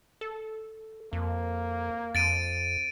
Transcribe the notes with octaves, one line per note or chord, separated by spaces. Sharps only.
A4
F2 A#3
F2 A6 D7 D#7